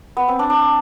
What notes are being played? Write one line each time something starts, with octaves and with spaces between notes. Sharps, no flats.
B3
C4
D4
D4